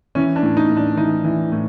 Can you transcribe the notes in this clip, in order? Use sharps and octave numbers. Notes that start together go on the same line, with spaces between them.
E3 C#4
D4
A2
D#4
A2
D4
E3 D#4
E3
A2